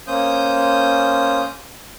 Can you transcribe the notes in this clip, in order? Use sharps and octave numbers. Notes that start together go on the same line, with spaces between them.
A#3 C#4 C5 D#6 G6